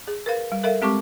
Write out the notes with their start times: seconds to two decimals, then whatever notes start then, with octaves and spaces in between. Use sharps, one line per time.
0.08 G#4
0.26 A#4 B4 F5
0.52 G3
0.63 A4 A#4 E5 F5
0.82 G#3 C4 G4 A5 C#6 D6